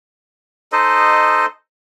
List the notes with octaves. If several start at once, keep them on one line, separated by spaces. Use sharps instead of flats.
D#4 A4 C5 D#5